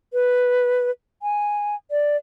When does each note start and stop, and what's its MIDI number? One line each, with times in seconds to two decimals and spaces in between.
0.13 0.91 71
1.22 1.75 80
1.91 2.17 74